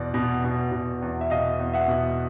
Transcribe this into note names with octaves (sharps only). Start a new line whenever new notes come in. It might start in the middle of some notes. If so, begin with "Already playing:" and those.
Already playing: E2 B2 D5
B2
B2
B2
E2
E5
B2 D#5 F5
E2
E5 F#5
B2